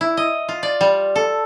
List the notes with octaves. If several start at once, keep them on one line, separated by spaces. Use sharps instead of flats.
E4
D#5
F4
D5
G3
A4